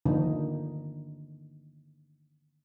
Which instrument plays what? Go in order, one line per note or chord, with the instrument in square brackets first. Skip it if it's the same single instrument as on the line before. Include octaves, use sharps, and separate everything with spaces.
[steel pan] D3 D#3 F3 A#3 D4 D#4